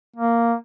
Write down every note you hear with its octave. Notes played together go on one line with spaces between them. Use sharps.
A#3